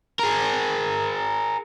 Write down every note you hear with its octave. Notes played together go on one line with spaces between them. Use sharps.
G#4 A#4